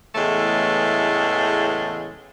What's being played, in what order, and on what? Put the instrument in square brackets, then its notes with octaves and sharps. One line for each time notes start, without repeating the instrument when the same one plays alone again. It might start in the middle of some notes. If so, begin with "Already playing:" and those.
[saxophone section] E2 A2 C#3 E3 G#3 A3